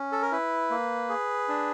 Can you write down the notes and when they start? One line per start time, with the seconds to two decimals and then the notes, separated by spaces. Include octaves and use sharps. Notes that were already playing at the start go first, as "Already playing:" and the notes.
Already playing: C#4
0.12 A4
0.22 A#4
0.32 E4 B4
0.70 A#3
1.09 G#4
1.48 D4